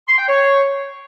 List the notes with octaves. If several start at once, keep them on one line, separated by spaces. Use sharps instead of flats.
C6
G5
C#5